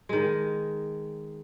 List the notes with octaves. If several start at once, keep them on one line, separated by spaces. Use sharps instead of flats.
D#3 G#3